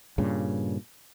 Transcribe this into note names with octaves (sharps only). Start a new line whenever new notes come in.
G2 A#2 C#3